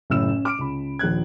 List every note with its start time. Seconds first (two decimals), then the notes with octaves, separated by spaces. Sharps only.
0.10 F#1 A2 C#3 E6 E7
0.28 C#4
0.45 D6 F6 D7
0.59 C#2 B5
0.99 A#1 D#2 F#6 G#6